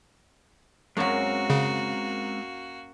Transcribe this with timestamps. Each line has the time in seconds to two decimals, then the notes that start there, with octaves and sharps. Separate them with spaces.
0.97 F#2 F#3 G#3 A#3 C4 F#4 A#4
1.50 C#3